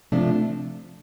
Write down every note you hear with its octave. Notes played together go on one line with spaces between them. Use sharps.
C3 F3 A3 D4